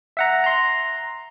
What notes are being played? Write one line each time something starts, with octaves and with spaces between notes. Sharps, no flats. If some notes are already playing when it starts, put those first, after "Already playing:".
E5 F#5 A#5
A#5 C6